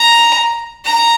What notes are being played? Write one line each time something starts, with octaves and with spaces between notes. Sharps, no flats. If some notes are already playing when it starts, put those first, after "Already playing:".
Already playing: A#5
A#5